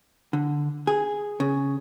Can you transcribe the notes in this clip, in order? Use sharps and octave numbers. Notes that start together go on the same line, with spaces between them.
D3
G#4
C#3